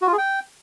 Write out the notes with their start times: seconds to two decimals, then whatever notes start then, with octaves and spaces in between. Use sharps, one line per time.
0.02 F#4
0.07 F4
0.13 G#4
0.18 G5